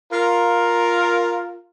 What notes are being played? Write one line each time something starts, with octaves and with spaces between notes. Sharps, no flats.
F4 A#4